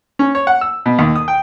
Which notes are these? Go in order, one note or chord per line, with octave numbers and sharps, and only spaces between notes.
C#4
C#5
F#5
E6
B2
D#2
D#6
G5